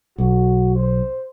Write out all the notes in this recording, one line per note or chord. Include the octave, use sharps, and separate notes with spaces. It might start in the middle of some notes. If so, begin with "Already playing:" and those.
B1 F#4
C5